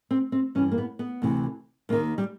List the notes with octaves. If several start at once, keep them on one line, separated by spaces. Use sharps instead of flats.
C4
C4
G2 E3 C#4
A#3
B3
B3
D2 C3 E3
D#2 D#3 A#3
G3